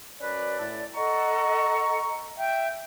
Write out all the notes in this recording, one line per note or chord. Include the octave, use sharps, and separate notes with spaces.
F#2 C#4 B4 D5
A2 A5
A4 D#5 F#5 A#5 C#6
E5 G5 G6